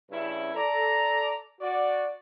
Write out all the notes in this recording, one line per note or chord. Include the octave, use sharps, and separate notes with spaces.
G2 C#3 C#4 E4
A4 D5 A#5
F#4 D5